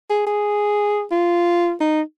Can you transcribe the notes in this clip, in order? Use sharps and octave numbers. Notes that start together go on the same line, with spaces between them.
G#4
G#4
F4
D#4